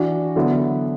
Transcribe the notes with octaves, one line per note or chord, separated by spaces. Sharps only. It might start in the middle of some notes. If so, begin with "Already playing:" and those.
Already playing: E3 D4 F#4
D3 F#3 B3 E4